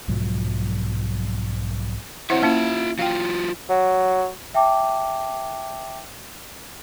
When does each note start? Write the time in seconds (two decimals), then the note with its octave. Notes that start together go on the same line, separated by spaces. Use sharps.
0.08 B1 G#2 F3 F#3
2.30 C4 E4 C5 C#5 E5 F#5
2.43 A#3 C#4 E4 F4 E5
2.99 F#3 F4 F5 G5
3.70 F#3
4.54 E5 G5 A5 D6